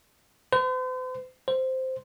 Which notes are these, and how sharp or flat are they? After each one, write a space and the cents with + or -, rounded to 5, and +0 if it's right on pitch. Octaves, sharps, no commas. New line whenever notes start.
C5 -45
C5 -5